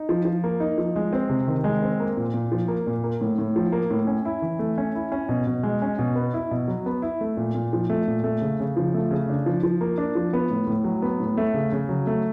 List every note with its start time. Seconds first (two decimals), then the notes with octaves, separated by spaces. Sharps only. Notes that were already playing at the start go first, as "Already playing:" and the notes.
Already playing: D#4
0.09 F3
0.25 F3
0.44 A#3
0.60 D#4
0.78 F3
0.96 G#3
1.13 C4
1.29 C3
1.48 D#3
1.64 G#3
1.82 C4
2.00 A#3
2.17 A#2
2.33 A#2
2.52 F3
2.68 A#3
2.87 A#2
3.04 A#3
3.21 A2
3.38 A2
3.56 F3
3.72 A#3
3.90 A2
4.07 C#4
4.25 E4
4.42 E3
4.59 A3
4.78 C#4
4.95 E4
5.12 C#4
5.29 B2
5.47 B2
5.63 G#3
5.82 C#4
5.99 B2
6.16 B3
6.34 E4
6.51 B2
6.68 F#3
6.86 B3
7.02 E4
7.21 A3
7.37 A#2
7.54 A#2
7.73 F3
7.90 A3
8.07 A#2
8.24 A3
8.41 C#3
8.60 C#3
8.77 F3
8.94 A3
9.11 C#3
9.29 D4
9.46 F3
9.63 F3
9.81 A#3
9.98 D4
10.15 F3
10.33 B3
10.50 A2
10.67 A2
10.84 F#3
11.02 B3
11.20 A2
11.37 A3
11.54 C#3
11.72 C#3
11.89 F#3
12.07 A3